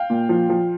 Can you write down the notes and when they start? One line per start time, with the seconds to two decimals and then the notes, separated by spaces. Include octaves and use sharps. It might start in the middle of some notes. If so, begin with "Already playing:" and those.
Already playing: F5 G5
0.10 A#2
0.29 F3
0.49 F3